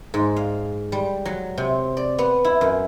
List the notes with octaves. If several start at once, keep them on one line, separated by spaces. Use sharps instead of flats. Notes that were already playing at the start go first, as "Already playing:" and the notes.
G#2
F5
G3
F#3
C3
D5
B3
E4
F#2